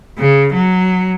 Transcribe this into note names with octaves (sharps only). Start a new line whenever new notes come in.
C#3
F#3